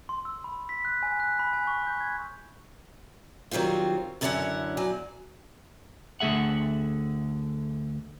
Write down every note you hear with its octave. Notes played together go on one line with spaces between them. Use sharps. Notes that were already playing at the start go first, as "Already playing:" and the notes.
C6
E6
B5
B6
F#6
G#5
F#6
B5
G#5
C#6
G6
G#6
D#3 F#3 G3 C4 F4
F#2 D3 C#4 E4 G4 F#5
E2 F#3 D5 G#5
D2 D3 A3 G#4 E5 F#5